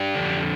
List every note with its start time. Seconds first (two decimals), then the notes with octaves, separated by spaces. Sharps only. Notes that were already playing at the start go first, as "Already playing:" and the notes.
Already playing: D4 G4
0.15 F2 D3